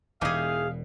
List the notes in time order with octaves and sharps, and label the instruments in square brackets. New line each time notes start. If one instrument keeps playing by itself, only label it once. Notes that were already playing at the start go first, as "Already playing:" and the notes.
[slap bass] E1 B2 [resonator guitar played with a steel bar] E3 D#4 G4 [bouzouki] G#4 G#5 [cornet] F5